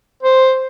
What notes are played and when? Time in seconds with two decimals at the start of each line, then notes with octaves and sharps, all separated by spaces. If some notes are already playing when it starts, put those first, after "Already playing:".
0.23 C5